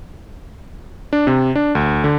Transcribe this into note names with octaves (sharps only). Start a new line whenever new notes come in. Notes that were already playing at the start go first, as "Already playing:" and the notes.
D4
C3
D4
D2
D3